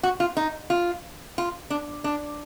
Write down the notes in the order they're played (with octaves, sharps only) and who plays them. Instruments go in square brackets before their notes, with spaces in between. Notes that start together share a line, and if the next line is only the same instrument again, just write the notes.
[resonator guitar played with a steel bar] F#4
F4
D#4
F4
F4
D4
D4